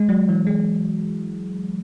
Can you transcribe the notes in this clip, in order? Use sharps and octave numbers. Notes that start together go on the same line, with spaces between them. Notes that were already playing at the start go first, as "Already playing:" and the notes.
Already playing: G#3
F#3
E3
G#3